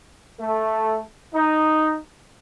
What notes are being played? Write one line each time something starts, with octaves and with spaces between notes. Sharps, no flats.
A3
D#4